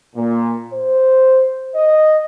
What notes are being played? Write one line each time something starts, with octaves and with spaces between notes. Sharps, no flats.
A#2
C5
D#5